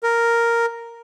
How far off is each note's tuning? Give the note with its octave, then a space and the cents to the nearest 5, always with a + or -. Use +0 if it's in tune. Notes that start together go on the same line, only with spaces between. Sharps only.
A#4 +0